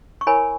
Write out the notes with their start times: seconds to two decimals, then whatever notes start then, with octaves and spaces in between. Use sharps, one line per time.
0.21 C#6
0.27 E4 A#4 C#5 G#5 B5